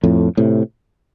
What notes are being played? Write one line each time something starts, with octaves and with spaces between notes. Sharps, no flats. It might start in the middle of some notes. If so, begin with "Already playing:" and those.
F2 A2
A2 C3